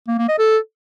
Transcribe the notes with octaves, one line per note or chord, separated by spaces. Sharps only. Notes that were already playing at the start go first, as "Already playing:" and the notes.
A#3
A#3
D#5
A4